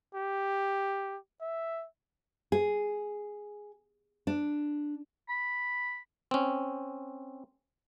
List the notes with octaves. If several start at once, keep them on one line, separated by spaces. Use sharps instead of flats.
G4
E5
G#4
D4
B5
C4 C#4